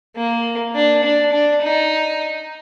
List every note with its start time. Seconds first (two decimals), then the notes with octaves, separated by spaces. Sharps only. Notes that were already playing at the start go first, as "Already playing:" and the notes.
0.16 A#3
0.75 D4
1.03 D4
1.32 D4
1.62 D#4